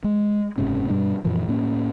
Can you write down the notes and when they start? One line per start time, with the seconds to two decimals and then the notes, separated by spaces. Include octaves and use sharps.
0.04 G#3
0.58 F#1 G#2 C3 C#4
0.89 G2 B2 G3 D4
1.25 F#2 A#2 E3 F3
1.48 A2 A#3 C#4